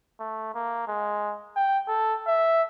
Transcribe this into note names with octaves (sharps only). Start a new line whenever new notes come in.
A3
A#3
G#3
G5
A4
E5